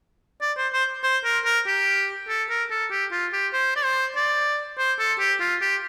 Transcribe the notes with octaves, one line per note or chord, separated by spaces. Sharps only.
D5
C5
C5
C5
A#4
A#4
G4
A4
A#4
A4
G4
F4
G4
C5
D5
C5
D5
C5
A4
G4
F4
G4